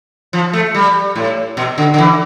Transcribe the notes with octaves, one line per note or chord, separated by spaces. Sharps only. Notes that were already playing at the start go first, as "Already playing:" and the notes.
F3
A3
G3
A2
B2
D3
D3
E3